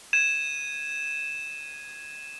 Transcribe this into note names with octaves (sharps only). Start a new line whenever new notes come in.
G#6 D#7 E7